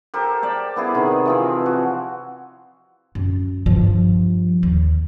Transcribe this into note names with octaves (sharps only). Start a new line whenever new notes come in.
G4 A4 A#4 C5
D5 G5 A5
B3 E4 G#4
C3 D#3
E3 F3 C4
F#4
F#2
G2 F3
D#2